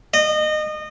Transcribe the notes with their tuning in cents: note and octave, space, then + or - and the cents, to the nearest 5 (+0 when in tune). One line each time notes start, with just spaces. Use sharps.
D#5 -25